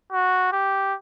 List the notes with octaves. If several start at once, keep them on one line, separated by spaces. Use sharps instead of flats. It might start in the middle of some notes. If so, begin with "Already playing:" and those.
F#4
G4